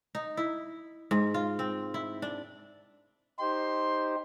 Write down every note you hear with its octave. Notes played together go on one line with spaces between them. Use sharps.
D#4
E4
G#2
F4
C4
E4
D4
D#4 G4 C5 C6